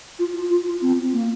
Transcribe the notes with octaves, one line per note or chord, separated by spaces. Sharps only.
F4
F4
F4
F4
C4
A#3